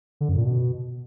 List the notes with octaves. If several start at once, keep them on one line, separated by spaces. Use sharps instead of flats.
D3
F#2
A#2
B2